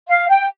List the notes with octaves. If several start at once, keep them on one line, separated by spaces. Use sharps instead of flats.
F5
G5